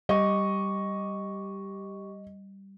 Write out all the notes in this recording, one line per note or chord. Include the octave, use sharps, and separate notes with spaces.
G3 G4 D#5 C#6